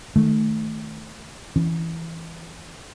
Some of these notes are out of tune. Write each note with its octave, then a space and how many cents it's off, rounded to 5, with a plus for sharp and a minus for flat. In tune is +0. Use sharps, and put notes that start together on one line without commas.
D#3 +0 A3 -10
E3 +0 C#4 +0